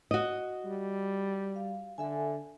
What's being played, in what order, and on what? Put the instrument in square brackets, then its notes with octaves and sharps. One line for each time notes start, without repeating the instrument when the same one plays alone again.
[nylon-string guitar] F#4 D#5
[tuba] G3
[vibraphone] F5
[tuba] D3 [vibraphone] A4 E5 G#5